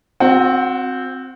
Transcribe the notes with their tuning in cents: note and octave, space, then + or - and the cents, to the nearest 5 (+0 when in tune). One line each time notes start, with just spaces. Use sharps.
C4 +0 F#4 -35 F#5 +20